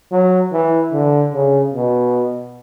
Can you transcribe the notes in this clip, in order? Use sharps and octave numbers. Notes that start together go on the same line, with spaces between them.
F#3
E3
D3
C#3
B2